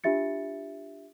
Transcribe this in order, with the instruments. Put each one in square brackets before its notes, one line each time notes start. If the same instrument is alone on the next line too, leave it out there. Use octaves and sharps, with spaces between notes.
[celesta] D4 F4 G4 E5 A6 C#7